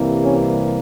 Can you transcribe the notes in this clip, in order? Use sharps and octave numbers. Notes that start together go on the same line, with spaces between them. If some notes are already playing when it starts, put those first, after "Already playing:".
Already playing: C2 C3 E3 G3 A#3
C#4